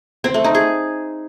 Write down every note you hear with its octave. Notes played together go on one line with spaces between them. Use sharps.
C4
A3
D#4
G#4